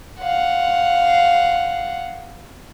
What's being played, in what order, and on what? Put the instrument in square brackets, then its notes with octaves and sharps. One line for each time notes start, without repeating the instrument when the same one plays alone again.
[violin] F5 F#5